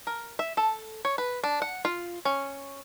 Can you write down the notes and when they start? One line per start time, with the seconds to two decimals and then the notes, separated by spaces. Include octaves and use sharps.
0.07 A#4
0.39 E5
0.57 A4
1.05 C#5
1.18 B4
1.44 D4
1.62 F#5
1.85 F4
2.25 C#4